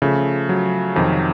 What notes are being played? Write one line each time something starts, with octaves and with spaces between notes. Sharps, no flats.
C#3 F3 A3
F#3
F2 C3 D#3